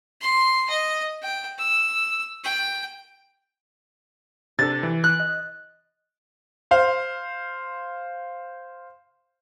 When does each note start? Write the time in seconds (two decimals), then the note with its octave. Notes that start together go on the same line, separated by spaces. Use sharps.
0.21 C6
0.70 D#5
1.22 G5
1.59 E6
2.44 G5
4.59 C3 D4 A4 A6
4.83 E3
5.04 F#6
5.20 D#5
6.71 C5 F5